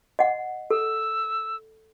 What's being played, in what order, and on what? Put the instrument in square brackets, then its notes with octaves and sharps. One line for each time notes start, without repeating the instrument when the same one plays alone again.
[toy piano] D#5 F#5
[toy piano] A4 [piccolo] E6